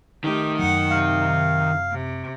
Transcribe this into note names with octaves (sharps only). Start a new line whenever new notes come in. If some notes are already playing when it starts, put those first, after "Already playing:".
D#3 A3 D#4 G4
F#2 F#3 F#5
C3 F5
C3